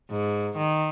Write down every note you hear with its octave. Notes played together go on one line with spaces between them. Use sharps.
G#2
D#3